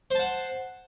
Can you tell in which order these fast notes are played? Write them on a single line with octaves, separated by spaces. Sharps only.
C5 A5 F#5